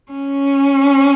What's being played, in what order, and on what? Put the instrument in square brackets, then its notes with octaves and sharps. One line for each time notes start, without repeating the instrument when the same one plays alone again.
[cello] C#4